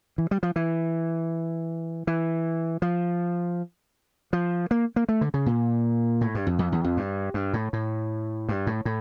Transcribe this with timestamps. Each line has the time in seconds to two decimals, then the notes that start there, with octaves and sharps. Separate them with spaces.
0.18 E3
0.31 G3
0.43 F3
0.56 E3
2.07 E3
2.82 F3
4.33 F3
4.71 A#3
4.96 A#3
5.09 A3
5.21 D3
5.34 C#3
5.46 A#2
6.21 A2
6.35 G2
6.47 F2
6.59 F2
6.72 E2
6.84 F2
6.97 G2
7.34 G2
7.54 A2
7.73 A2
8.49 G2
8.67 A2
8.85 A2